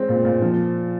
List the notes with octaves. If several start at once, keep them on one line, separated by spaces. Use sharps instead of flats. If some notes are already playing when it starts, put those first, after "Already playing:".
Already playing: G#3 C4
A#2
A#2
F3